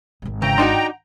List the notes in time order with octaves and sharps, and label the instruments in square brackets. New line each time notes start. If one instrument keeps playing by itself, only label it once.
[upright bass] G#1 G#2
[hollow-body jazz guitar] C#3 [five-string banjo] E3 [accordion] G5 A#5
[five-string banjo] D4 D#4 F#4 [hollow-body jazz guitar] F#5 A5 C6